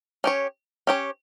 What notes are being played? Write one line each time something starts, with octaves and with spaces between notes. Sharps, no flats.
C#4 G4 C#5
C#4 G4 C#5